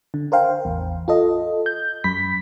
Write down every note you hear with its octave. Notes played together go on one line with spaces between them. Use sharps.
D3
A#4 C5 F5 G5
A1 E2
F4 A4 D#5
G6
F#2 B5 B6